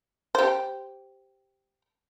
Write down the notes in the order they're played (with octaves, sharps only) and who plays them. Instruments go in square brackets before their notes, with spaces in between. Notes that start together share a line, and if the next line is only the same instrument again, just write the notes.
[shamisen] G4 C5